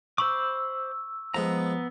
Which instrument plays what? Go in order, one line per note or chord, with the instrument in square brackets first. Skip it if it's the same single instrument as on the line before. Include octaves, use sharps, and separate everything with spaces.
[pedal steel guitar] C5 B5 D6 [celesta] C#6 [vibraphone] E6
[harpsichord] F3 G#3 [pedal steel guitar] B3 A#5